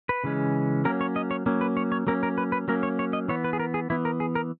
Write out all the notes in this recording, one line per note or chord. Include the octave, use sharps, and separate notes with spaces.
B4
C#3 E3 G#3 C#4
F#3 A#3 C#4 A#4
C#5
D#5
C#5
F#3 A#3 C#4
B4
C#5
C#5
F#3 A#3 C#4 A#4
A#4
B4
B4
F#3 A#3 C#4 A#4
C#5
C#5
D#5
E3 B3 C#5
B4
G#4
A#4
G#4
E3 B3 E4
A#4
G#4
A#4